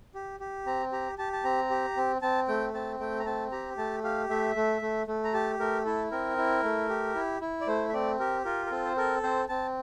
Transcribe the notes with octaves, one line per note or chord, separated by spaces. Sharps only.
G4
G4
C4 A#5
G4 A#5
G4 A5
A5
C4 A#5
G4
C4
C4 A5
A3 G5
C4 A5
A3 G5
A#5
C4 A5
G4 A#5
A3 A5
G4 F5
A3 E5
A3
A3
A3
A#5
G4 A5
A3 A#4
E4 A4
C4 A#4
E4
A3
G4
E4
E4
D5
A3 C5
E5
C4 D5
G4 A#4
F4 A#4
A#4
C4 A4
C5
A4 A#4
C4 C5
C4 A5